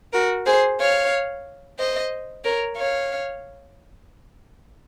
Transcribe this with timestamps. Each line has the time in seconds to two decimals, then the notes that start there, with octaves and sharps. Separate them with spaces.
0.13 F#4 A#4
0.46 G#4 C5
0.79 C#5 F5
1.79 C5 D#5
2.44 A#4 C#5
2.77 C#5 F5